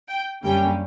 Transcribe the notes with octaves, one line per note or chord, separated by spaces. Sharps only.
G5
F#2 D3 G3 A#3 C#4 G5